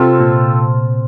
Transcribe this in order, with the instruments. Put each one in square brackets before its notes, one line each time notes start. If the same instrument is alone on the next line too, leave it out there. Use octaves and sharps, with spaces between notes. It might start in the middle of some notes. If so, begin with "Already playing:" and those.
Already playing: [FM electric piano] C3 [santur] C4 F4 A4
[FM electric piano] A#2